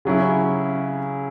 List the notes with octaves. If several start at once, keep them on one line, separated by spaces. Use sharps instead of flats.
C#3 F#3 C#4 E4